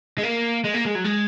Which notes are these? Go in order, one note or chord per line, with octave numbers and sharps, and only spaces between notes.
G#3
A#3
G#3
A#3
G#3
F#3
G#3